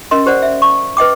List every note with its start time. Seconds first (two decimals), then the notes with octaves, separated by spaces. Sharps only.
0.11 C#4 A#4 D#5 C6
0.26 G4 C5 D5 F#5
0.42 E5
0.62 C#6
0.97 B4 D#5 G5 D6